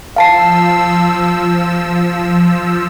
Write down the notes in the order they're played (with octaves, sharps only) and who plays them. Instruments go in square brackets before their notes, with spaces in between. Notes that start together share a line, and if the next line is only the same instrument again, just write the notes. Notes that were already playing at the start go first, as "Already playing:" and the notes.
[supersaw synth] F3 E6 [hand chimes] F5 A5 C7